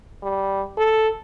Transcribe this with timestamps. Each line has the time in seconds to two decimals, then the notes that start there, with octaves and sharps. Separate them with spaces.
0.23 G3
0.78 A4